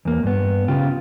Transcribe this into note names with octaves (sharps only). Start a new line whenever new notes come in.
E2 A#3
G2 B3
C#3 F4 G4